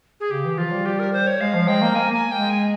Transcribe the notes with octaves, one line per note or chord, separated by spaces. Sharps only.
G#4
C#3 G4
E3
F3 F4
G3
G4
A#4
C5
C#5
G#3 F5
F3
G#3 G5
A#3
A#3 G#5
A#3 G#5
G#3 G5
G#5